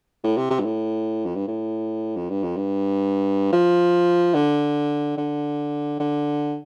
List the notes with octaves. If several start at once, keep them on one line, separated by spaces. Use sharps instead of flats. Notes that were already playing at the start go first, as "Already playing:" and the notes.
A2
C3
C3
G2
A2
F2
G2
A2
F2
G2
F2
G2
F3
D3
D3
D3